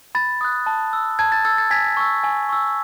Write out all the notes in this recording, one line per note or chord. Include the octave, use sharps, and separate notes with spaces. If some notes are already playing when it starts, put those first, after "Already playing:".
B5 A6
D#6 F#6
A5
E6
A5 G#6
A6
E6 A6
A6
G#5 G#6 B6
C#6 E6
G#5
C#6 E6